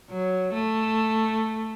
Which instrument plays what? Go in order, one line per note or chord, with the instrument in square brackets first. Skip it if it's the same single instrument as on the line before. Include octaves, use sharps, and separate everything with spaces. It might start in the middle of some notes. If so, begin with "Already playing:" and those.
[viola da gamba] F#3
A3